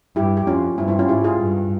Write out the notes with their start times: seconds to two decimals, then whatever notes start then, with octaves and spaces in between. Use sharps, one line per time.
0.16 G2 E4 G4
0.37 G4
0.47 F2 C#4 F4
0.78 G2 C4 E4
0.88 C4 E4
0.99 C#4 F4
1.09 G#2 E4 G4
1.24 F4 G#4
1.41 G2